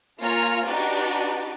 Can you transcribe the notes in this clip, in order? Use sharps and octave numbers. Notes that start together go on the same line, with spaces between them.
A#3 F4 C#5 G#5 A#5 F6
D4 D#4 F#4 G4 B4 D5